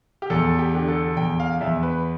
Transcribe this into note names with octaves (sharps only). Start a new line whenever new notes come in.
G4
E2 A4
G4
D3 G4
A4
E2 G5
F5
E2 E5
B4